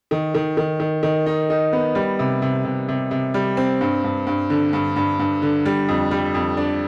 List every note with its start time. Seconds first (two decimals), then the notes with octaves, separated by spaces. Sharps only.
0.11 D#3
0.35 D#3
0.57 D#3
0.80 D#3
1.03 D#3
1.26 D#4
1.50 D#4
1.73 B3
1.95 G3
2.19 C3
2.42 C3
2.64 C3
2.88 C3
3.11 C3
3.34 G3
3.57 C4
3.81 G2
4.04 G2
4.27 G2
4.50 D3
4.73 G2
4.96 G2
5.19 G2
5.42 D3
5.66 G3
5.89 F2
6.11 G3
6.34 F2
6.57 D4